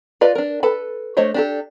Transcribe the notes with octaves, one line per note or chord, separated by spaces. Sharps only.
F4 B4 D5 D#5
D4 A#4
A4 B4 A5 B5
A3 D4 C5 C#5 D#5
D4 G4 A4